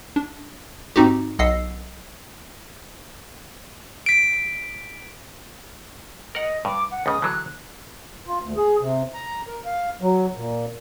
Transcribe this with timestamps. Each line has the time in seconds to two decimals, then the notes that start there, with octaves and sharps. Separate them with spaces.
0.16 D4
0.96 G#2 C4 D#4 F#4 G4
1.39 B1 D#5 F#5 E6 C7
4.06 B6 D7
6.35 A#4 D#5 F#5
6.65 G2 D6
6.91 F#5
7.06 C#2 C#3 D#6
7.22 D3 E3 F#3 F#6
8.25 F4
8.42 D2
8.57 G#4
8.81 C3
9.14 A#5
9.47 A#4
9.65 F5
10.01 F#3
10.36 A#2